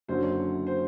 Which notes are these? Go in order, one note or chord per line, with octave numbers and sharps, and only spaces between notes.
F#1 F#2 D3 F#3 C5
C#5
C5